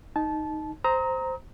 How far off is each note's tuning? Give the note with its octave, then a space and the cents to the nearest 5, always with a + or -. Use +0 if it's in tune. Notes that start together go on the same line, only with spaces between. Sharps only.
D#4 +0 A5 -20
C5 -5 A#5 +0 D#6 +40